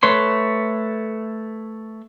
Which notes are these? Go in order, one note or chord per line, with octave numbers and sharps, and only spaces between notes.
A3 B4 C#5 C6